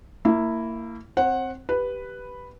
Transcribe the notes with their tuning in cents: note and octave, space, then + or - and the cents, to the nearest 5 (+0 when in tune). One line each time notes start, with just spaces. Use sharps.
A#3 -25 E4 +0
C4 +0 C5 +40 F#5 +0
G4 +0 B4 +0